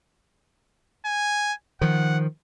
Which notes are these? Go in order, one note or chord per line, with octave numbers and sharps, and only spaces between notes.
G#5
D#3 F3 F#5